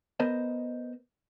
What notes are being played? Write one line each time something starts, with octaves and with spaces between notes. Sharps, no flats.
B3 A#4 C5 D#5